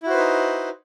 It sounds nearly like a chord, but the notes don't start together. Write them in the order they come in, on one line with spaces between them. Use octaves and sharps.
E4 F#4 C5 B4 D#4